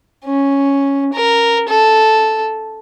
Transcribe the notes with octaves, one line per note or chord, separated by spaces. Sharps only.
C#4
A#4
A4